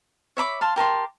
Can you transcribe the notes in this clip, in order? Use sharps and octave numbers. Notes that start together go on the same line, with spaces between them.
C#5 E5 B5 D6
F5 A5 C6
G4 A#4 A5 C6